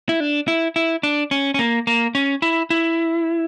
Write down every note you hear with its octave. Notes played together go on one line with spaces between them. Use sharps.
E4
D4
E4
E4
D4
C#4
C#4
A#3
A#3
C#4
E4
E4